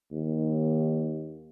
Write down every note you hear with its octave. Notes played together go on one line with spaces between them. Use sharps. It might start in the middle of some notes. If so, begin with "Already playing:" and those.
D#2